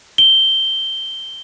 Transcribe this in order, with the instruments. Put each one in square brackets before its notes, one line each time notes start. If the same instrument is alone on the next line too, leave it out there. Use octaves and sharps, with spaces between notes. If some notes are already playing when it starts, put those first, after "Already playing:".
[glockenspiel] G7